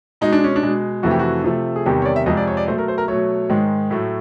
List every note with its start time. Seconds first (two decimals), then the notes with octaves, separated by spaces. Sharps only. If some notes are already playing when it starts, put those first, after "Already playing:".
0.21 B2 G#3 D#4
0.33 D4
0.44 C#4
0.56 D4
0.63 B2 G#3
1.03 F2 C3 E3 A3 F#4
1.11 G4
1.19 F#4
1.44 C3 F3 A3
1.76 G#4
1.86 E2 C3 D#3 G3 G4
2.02 C#5
2.05 D5
2.16 E5
2.26 F2 C3 F3 G#3 D#5
2.37 D5
2.48 C#5
2.57 D5
2.68 B2 F#3 A3 C5
2.78 A#4
2.88 C5
2.98 A#4
3.08 B2 F#3 A3 C#5
3.50 G#2 D#3 G#3
3.91 A2 F#3 A3